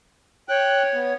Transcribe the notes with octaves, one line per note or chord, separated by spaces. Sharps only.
C#5 G5 F#6
B3